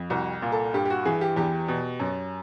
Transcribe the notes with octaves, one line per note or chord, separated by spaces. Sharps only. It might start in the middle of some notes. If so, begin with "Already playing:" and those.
Already playing: F2
C2 F#4
A#2
A4
G2 G4
G4
F#4
E3 G#4
G4
E2 G4
B2
F#2